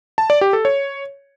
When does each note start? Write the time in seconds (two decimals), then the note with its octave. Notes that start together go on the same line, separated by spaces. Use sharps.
0.18 A5
0.30 D5
0.41 G4
0.53 A4
0.65 C#5